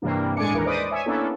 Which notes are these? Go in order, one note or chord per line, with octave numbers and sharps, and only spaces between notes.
G2 C3 E3 G3 A#3 D4
A2 G#3 D4 G#5 D6 C#7
D#2 E3 A#4
B4 C5 D5 D#5 D6 D#6
C#5 E5 G#5
A#3 B3 C#4 D4 E4 A4